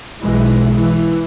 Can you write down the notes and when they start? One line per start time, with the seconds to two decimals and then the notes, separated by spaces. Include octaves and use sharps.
0.22 B1 E3 G#3
0.73 E3